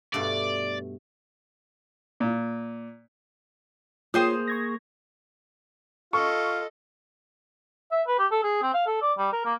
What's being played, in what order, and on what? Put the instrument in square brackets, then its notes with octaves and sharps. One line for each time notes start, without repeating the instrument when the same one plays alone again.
[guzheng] G2 B2 A3 [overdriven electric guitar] D5
[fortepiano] A#2
[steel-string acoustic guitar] A#3 [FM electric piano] F4 C#5 G5 [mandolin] G#4 C5 D#6
[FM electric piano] C#6 G#6 A#6
[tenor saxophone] F4 [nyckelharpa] A4 D#5 [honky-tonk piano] C#6
[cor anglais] E5
B4
G4
A4
G#4
C4
F5
A4
D5
G3
A#4
A#3